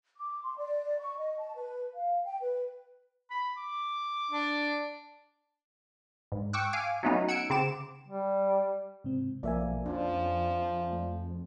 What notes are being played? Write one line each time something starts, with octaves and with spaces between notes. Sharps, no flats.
D6
C6
D5
C#6
D#5
A5
B4
F5
G5
B4
B5
D6
D4
G#2
G5 C#6 D6 E6 F#6
F5 G#5 D6
F#3 A3 B3 C#4 D#4
F#5 E6 G#6 C#7 D7
C#3 C4 D6 E7
G3
G#2 C3 C4
B1 F3 A#3 A4 D5 E5 G#5
F2 F3 C#4 D4
A3